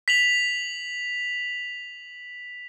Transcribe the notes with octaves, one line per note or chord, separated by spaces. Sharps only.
B6 F7 F#7